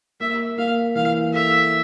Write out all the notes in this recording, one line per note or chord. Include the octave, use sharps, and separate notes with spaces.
A#3 E5
A#3 F5
E3 F5
A4 E5